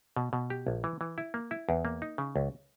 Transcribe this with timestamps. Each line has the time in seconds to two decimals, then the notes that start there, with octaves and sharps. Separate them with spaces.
0.16 B2
0.33 B2
0.50 G4
0.67 A#1
0.84 E3
1.01 E3
1.18 E4
1.34 A#3
1.51 E4
1.69 E2
1.85 A#3
2.02 D#4
2.18 C#3
2.36 C#2